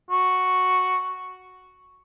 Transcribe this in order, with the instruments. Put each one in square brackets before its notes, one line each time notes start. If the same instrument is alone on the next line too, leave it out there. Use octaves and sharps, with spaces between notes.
[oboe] F#4